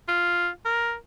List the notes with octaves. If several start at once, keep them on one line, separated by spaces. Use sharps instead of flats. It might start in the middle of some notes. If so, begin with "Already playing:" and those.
F4
A#4